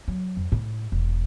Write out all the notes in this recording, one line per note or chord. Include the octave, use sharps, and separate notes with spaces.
F#3
F2
A2
E1